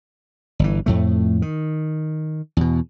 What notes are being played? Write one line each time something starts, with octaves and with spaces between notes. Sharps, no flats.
G1 E3
F2 A2 A3
D#3
E2 B2